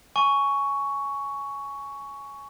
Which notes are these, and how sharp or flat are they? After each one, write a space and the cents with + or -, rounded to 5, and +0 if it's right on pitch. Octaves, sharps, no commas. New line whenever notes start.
G#5 +10 C#6 +10